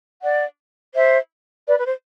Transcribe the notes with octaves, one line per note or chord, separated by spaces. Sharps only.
D5 F#5
C5 E5
B4 D5
B4
C5